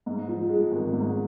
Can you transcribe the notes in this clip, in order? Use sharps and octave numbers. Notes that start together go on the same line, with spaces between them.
G#2
F3
G#3
G#1
G#2